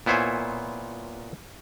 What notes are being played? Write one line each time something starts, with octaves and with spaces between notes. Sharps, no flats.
A#2 B3 E4 C5 C#5 G#5